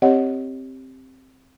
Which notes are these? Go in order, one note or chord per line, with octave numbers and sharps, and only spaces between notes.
C4 G4 C#5 D#5 F#5